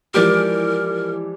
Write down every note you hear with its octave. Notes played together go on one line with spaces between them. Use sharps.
E3 F3 G#3 G4 A#4 D5